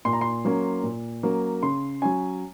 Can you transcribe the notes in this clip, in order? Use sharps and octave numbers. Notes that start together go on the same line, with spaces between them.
A#2 C6
A#5
C6
F#3 A#3 C#4
A#2
F#3 A#3 C#4
C#3 C6
F#3 C#4 G#5